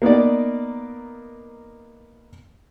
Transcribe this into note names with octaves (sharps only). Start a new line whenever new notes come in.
A#3 B3 D#4 D5